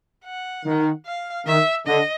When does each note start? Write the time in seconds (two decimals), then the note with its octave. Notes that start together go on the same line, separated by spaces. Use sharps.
0.25 F#5
0.65 D#3
1.06 F5
1.46 D#3 E5
1.87 D3 D#5